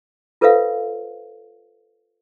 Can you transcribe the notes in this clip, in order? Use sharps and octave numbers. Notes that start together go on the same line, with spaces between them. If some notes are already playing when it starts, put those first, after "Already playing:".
F4 A4 B4 C5 E5 F5